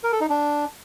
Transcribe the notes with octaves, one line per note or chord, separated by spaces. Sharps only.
A#4
A4
D#4
D4